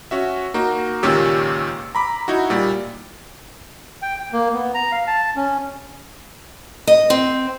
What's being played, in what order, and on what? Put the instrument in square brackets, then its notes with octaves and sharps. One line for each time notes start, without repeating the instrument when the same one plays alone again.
[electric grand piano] C#4 F#4 E5
A#3 D#4 F#4
C#2 A#2 D#3 C#4 G4 E6
A#5 B5 D6
D#4 E4 F#4
A#2 G3
[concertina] G5
G5
A#3
B3
A#5
F5
A5
C#4
[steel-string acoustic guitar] D#5
C4